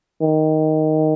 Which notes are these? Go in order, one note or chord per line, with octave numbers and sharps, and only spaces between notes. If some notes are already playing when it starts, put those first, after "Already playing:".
D#3